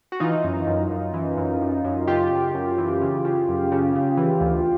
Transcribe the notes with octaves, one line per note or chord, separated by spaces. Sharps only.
F#4
E3 D#4 F4
F#2
F#2
F#2
E3
F#2
F#2
F#2
C#3 F4 G4
F#2
F#2
E3
C#3
C#3
F#2
C#3
C#3
E3
D2